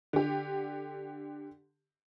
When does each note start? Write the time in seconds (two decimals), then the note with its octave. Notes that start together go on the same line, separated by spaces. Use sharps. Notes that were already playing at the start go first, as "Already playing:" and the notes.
0.13 D3 G4